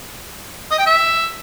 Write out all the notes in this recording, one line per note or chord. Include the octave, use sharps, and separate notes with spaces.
D#5
G5
E5